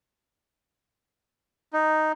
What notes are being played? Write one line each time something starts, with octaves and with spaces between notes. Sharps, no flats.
D#4